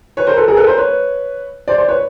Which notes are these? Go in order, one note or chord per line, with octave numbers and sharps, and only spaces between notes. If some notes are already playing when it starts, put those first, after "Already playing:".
B4 C#5
A#4 C5
A4 B4
G#4 A#4
A4 B4
A#4 C5
B4 C#5
C5 D5
C5 D5
B4 C#5